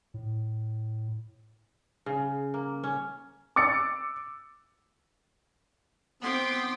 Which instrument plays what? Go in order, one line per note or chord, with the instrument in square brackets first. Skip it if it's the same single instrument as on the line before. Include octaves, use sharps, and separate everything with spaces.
[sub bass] A2
[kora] C#3
A#3
C#4
[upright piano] D6 E6 A6 C#7
[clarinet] B3 [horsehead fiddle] C4 [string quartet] G5 C6 D6